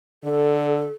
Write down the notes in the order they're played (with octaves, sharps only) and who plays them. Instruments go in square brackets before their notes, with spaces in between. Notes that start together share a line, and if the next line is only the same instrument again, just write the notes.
[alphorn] D3 [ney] A4